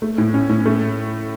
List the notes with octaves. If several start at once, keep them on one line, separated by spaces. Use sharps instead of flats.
A3
A2
C#4
A2
A3